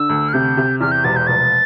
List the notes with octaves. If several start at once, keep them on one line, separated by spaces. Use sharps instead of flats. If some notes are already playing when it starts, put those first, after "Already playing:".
Already playing: D3 E6
D2
F6
C3 G6
C3
E2 F6
G6
E1 A6
G6
F1 A6